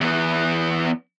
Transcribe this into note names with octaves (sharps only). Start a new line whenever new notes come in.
E2 B3